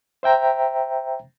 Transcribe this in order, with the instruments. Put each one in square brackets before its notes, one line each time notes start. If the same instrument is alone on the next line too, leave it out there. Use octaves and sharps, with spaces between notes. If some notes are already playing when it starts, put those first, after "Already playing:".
[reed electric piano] C5 E5 G5 A#5